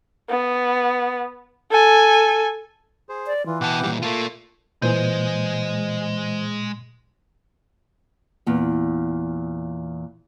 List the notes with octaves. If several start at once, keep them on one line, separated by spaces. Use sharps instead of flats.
B3
A4 G#5
G#4 C5
D5
E3 F4
B2 F#5 G5 A5 D6
A#2 G3
A3 A#3 F4 A4 C6
A#2 E3 G#3 C5 D#5 G6
E2 A#2